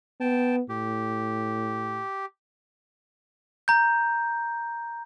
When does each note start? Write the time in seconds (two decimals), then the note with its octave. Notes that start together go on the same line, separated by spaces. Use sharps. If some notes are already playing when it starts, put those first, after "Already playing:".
0.21 B3 G5 A5
0.69 A2 G4
3.68 A#5 G6